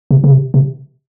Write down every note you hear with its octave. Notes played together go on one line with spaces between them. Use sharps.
C3
C#3
C3
C3